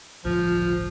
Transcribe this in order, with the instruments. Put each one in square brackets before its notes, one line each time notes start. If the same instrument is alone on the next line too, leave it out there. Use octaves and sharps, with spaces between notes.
[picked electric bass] G1 C#2 A2 [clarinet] F3 [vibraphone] F4